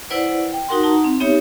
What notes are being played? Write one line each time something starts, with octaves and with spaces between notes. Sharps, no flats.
E4 B4 C5 D5 F#5
G5
D#4 F#4 A#4 F#5 C6
D#4 F#5 A5 A#5
C4
B3 D#4 G4 C#5 E5